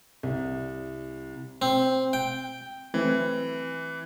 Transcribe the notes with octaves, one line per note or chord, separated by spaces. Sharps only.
C2
C4
G5
E3 F#3 A3 C4